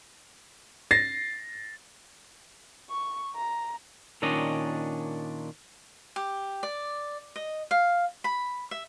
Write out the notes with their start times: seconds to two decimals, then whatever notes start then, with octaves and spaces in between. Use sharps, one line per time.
0.91 A6 A#6 C7
2.90 C#6
3.36 A#5
4.22 A#2 D#3 C#4 D4 D#5
6.16 G4
6.63 D5
7.36 D#5
7.71 F5
8.24 B5
8.71 E5